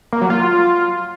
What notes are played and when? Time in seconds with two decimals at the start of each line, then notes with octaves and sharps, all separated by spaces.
0.13 A#3
0.21 F#3
0.30 F4